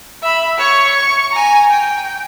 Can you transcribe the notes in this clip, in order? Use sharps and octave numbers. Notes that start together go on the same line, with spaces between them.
E5 B5
C#5 C#6
C#6
G#5 A#5
G5